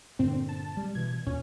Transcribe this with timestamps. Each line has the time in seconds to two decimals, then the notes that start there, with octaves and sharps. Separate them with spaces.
0.19 G2 A#2 D3 C4
0.49 A5
0.77 G3
0.95 B2 E3 G#6
1.27 D#2 A#2 C#4